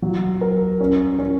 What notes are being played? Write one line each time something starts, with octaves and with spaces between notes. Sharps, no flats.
F#3
A#4
C#4
C#4